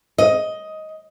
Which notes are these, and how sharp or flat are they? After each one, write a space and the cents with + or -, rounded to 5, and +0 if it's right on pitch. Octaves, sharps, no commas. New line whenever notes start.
D#5 +10